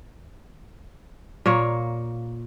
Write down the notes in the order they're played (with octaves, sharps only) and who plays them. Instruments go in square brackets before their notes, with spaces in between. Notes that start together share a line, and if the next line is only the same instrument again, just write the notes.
[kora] A#2 A#3 C#5